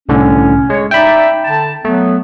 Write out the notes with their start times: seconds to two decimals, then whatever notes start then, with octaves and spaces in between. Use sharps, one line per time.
0.09 C2 A2 D3 C#4
0.70 G#3 C#5
0.91 D#4 D5 E5 G5 B5
1.44 D3 A5
1.85 F#3 A3 B3